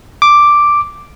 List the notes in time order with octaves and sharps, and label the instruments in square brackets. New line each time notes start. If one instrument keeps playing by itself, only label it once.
[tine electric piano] D6